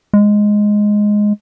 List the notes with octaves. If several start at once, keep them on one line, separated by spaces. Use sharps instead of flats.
G#3